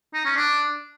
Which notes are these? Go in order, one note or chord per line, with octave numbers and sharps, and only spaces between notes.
D#4
C#4
D4